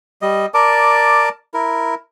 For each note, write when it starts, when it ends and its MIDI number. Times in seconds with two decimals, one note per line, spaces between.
0.22 0.46 55
0.22 0.46 75
0.54 1.29 70
0.54 1.29 74
0.54 1.29 81
0.54 1.29 86
1.54 1.95 64
1.54 1.95 70